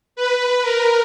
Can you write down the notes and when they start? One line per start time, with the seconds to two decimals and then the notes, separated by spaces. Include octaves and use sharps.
0.16 B4
0.62 A#4